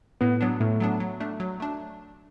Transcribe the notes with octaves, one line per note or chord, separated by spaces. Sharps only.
A2 B3
F#3 B3 D4
A2 A3
F#3 B3 D4
F#3
A3 D4
F#3
A3 D4